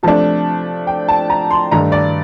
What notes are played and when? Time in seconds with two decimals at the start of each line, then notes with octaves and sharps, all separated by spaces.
0.03 C3 F3 A3 D4 A5
0.87 G5
1.08 A5
1.30 A#5
1.51 C6
1.72 G2 D#3 A3 D4 A#5
1.92 D5